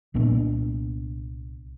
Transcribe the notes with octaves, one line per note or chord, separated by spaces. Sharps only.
C2 A#2 B3 D4